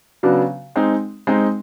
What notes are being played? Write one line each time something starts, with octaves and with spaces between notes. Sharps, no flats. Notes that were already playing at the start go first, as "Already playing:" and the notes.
C#3 F#3 B3 D4 F#4
G#3 C4 D#4
G#3 C4 D#4